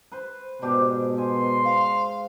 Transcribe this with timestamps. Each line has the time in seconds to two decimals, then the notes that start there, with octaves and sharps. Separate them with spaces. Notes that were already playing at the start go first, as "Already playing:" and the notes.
0.12 B4 C5
0.62 G#2 B2 D4 G4
1.18 G#5 C6
1.65 F5